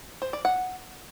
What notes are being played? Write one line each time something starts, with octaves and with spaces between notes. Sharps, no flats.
C5
D5
F#5